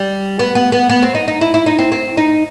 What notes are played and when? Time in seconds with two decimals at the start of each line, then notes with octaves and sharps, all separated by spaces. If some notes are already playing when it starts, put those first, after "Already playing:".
Already playing: G3
0.39 B3
0.55 B3
0.72 B3
0.89 B3
1.02 C4
1.15 D#4
1.28 D#4
1.41 E4
1.54 E4
1.66 D#4
1.79 C4
1.92 C4
2.17 D#4